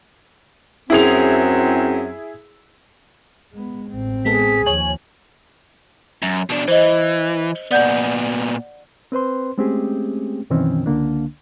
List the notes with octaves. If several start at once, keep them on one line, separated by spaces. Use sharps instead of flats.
F#2 C4 E4 G#4 F7
G#3 B3
A1 C4
G#3 B3 G#4 A4 B6
D#2 F3 C#5 G#5 F#7
F#2
B2 D4
E3 C5 D#5
A#2 B3 D5 F#5 G6
C4 B4 C5 C6
G#3 A3 C4 C#4 G4 G#4
F#2 B2 D#3 E3 C4 C#4
C#2 D3 A#3 D4